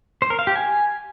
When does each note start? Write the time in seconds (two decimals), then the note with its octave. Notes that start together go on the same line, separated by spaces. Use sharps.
0.22 C5
0.30 A#4
0.39 F5
0.47 G4
0.56 G#5